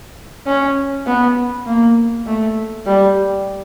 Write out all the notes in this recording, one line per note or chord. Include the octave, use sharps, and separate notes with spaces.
C#4
B3
A#3
A3
G3